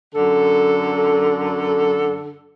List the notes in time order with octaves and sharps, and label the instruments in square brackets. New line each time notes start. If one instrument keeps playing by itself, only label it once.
[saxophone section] F#2 D3 A4